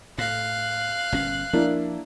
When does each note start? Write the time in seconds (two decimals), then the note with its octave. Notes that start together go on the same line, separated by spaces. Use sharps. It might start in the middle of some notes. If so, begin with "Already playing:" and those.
0.18 A2 F5 F#6
1.12 G1 A#2 C#4
1.53 F3 A#3 D4 E4